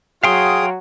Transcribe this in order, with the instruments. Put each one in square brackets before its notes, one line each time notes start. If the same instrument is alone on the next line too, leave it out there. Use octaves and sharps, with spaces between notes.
[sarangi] F#3 [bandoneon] G#4 D#6 [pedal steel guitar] F5 G5 C6